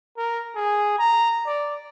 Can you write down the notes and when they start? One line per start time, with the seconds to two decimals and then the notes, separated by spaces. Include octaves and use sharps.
0.17 A#4
0.55 G#4
0.98 A#5
1.46 D5